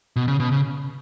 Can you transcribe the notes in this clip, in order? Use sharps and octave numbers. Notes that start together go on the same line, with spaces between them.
B2
C#3
B2
C#3